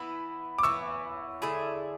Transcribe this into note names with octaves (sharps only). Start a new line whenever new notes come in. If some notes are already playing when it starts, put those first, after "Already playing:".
Already playing: E3 B3 E4 B5
D6
E3 B3 E4 C#6 E6
D3 A3 E4 G#4